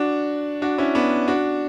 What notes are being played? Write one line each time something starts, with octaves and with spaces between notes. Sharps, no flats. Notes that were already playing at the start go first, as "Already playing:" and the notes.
Already playing: D4 F#4
D4 F#4
C#4 E4
B3 D4
D4 F#4